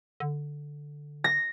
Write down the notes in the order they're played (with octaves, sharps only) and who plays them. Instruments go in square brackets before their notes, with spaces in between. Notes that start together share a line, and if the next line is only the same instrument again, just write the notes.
[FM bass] D3
[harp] A#6